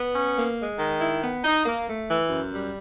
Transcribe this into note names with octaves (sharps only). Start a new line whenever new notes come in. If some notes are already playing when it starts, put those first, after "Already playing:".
Already playing: B3
C#4
A#3
G#3
D#3
E4
B3
D#4
A#3
A3
E3
F#2
G3